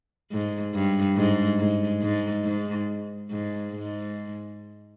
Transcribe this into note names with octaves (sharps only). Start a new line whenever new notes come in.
G#2
G2
G#2
G#2
G#2
G#2
G#2
G#2